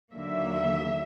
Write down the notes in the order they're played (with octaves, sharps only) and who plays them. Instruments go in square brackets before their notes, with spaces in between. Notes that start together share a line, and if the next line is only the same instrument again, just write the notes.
[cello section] D#2 D3 F#3 A#3 E5